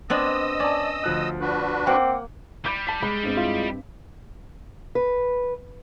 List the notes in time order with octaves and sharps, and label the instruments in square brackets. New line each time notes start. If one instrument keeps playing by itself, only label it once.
[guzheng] B3 C4 D4 [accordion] D#5 D#6 E6
[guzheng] C#4 [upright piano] D5 A5
[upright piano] D2 F3 F#6
[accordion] D4 F#4 B4
[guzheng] A#3 [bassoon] C4 [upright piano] F#5 D6
[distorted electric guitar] G3 [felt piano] B5 D6 G6
[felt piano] A5 B6
[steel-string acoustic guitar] G#3 [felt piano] B5
[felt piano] G2 C4
[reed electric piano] E4 F4
[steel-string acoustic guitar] B4